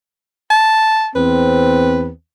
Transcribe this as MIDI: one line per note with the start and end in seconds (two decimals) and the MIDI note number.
0.51 1.09 81
1.16 2.10 40
1.16 2.10 60
1.16 2.08 71